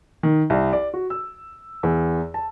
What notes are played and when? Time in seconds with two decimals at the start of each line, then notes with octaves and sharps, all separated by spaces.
0.23 D#3
0.50 C2
0.73 D5
0.94 F#4
1.10 E6
1.83 E2
2.34 A5